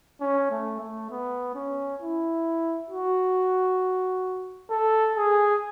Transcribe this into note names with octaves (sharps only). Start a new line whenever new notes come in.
C#4
A3
A3
B3
C#4
E4
F#4
A4
G#4